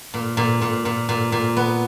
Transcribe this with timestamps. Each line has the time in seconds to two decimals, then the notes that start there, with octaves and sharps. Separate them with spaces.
0.14 A#2
0.37 A#2
0.62 A#2
0.85 A#2
1.09 A#2
1.32 A#2
1.56 B3